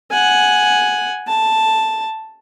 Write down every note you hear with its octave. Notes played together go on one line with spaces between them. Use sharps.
F#5 G#5
A5